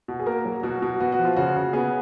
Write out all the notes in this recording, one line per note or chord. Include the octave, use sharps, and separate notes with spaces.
B2
G#4
A#3 A#4
F#3
B2 F#4
B2
B3 F#4
F#4
F3
F4
C#3 F#4
C#3
B3 G#4